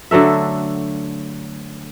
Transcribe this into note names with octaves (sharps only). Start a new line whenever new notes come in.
D3 F#3 A3 E5